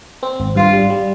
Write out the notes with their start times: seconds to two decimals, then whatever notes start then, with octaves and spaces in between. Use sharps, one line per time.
0.23 C4
0.40 G#1
0.55 G2 F4
0.73 G3
0.90 G3